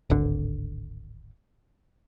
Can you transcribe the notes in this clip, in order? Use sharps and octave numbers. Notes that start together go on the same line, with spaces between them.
D1 G#1 D3